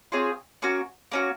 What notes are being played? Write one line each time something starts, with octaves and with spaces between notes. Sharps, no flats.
C4 F4 G#4 C#5
A#3 C#4 F#4
A#3 C#4 F#4